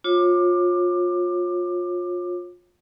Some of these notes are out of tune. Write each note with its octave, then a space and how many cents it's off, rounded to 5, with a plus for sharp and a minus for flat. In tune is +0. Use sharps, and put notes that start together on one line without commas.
F4 +25 C#5 -30 D6 +20